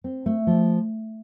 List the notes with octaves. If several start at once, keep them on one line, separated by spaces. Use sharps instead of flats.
C4
A3
F3